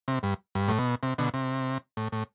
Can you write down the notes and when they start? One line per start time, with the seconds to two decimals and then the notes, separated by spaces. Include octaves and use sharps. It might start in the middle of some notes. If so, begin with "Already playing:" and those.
0.08 C3
0.23 G2
0.55 G2
0.68 A2
0.79 B2
1.03 C3
1.18 B2 D3
1.34 C3
1.97 A2
2.12 A2